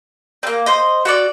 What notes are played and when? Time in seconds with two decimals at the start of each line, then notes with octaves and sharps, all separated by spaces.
0.43 A#3 C4
0.66 C5 D#5
1.05 F#4 A4 D5